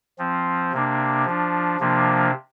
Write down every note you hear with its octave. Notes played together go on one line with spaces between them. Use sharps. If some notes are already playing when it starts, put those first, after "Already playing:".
F3 C4
C3 A#3 D4
F3 D4
C3 F3 A#3 D4